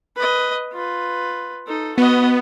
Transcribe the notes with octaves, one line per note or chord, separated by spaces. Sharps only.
B4 D#5
F4 B4
D#4 A4
B3 F#4 D#5